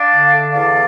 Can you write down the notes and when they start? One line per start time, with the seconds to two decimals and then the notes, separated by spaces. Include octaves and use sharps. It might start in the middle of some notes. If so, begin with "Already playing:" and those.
Already playing: D4 D5 F5
0.10 D3
0.32 A3
0.53 E2 D5 F5